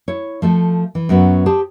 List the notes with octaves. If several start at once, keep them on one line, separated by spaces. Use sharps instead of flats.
E4 C#5
F3 A3 A4
E3
F#2 F#3 B3 B4
G4 G#4 C5 A5